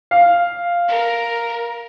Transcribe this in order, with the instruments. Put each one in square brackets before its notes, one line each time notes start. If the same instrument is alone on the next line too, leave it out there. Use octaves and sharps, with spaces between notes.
[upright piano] F5
[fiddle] A#4